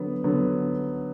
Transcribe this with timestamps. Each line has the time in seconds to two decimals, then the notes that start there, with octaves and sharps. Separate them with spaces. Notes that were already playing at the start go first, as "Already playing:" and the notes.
Already playing: D3 F#3 B3
0.24 D3 F#3 B3